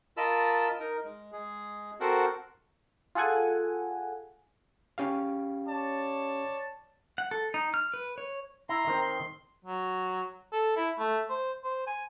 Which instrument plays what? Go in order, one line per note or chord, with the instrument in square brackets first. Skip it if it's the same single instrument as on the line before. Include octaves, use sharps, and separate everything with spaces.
[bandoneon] F4 A#4 D#5 A5 B5 E6
D#4 A#4
G#3
G#3 G#4
C4 F#4 A4 A#4 C5 F#5
[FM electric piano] F4 G#4 A4 F#5 G#5
[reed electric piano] C#4 G4 F5
[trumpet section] C#5 D5 A5
[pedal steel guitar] F#5
A4
D#4
F6
B4
C#5
[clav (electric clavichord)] E4 [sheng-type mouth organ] A#5 C6
[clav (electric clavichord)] D#3 C4
[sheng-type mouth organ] C6
[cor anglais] F#3
A4
E4
A3
C5
C5
G#5